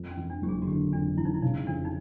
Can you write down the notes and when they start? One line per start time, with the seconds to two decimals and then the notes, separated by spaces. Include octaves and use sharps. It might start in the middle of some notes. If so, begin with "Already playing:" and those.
Already playing: F2
0.11 C#4
0.17 F2
0.30 D4
0.42 F#1 G4
0.49 G#4
0.62 F#4
0.67 D3 G4
0.92 F2 D4
1.17 F2 E4
1.25 D#4
1.34 E4
1.42 C#3 D#4
1.67 F2 D4
1.85 D#4